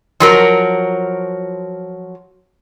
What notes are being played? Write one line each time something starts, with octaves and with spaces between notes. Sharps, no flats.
F3 F#3 A#4